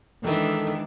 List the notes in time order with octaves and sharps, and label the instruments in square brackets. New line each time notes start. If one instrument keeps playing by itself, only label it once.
[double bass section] D#3 G#3 [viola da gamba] E3 D4 [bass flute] A4